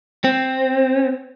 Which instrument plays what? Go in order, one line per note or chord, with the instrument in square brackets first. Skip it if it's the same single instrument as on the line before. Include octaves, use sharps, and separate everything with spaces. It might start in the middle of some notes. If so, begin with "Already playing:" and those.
[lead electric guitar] C4